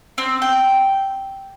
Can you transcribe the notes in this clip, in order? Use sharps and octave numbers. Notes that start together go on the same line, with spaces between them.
C4
G5